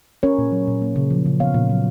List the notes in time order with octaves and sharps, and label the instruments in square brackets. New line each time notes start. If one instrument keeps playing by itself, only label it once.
[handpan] C#4 A#4 C#5
A#2
F#3
A#2
A#3
C#3
F3
C#3
B3 C#5 F5
A#2
F#3